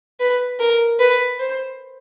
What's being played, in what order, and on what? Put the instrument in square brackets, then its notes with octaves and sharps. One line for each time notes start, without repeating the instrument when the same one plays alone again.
[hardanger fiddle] B4
A#4
B4
C5